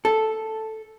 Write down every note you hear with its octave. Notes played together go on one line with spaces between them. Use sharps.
A4